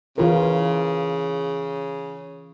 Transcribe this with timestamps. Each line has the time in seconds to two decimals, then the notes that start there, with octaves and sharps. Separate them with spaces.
0.18 C#3 E3 F4 A#4